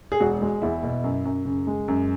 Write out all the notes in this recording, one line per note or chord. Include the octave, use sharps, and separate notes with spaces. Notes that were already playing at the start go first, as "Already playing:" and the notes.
G#4
E1 F#4
G#3
E2 E4
B2
F#2
F#2
C#3
G#3
F#2